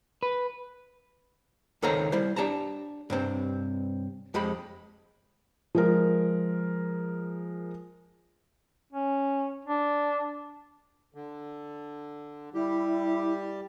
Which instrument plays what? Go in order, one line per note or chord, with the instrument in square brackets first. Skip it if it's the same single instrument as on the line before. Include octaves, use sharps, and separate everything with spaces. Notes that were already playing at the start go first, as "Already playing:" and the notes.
[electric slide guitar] B4
[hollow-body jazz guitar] C#2 D#3 A4 C5 F5 A#5
G3 E4 C5
D4 G4 A5 A#5
G2 C3 C4
F2 G#3 G4 B5
[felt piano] F3 G#3 A#4
[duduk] C#4
D4
[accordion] D3
[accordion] G3 G4 [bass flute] E4